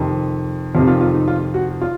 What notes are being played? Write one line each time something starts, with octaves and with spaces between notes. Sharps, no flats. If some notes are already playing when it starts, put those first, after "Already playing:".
Already playing: F2 C3 D#3
F2 C3 D#3 F4
F4
F4
D#4
F4
F#4
F4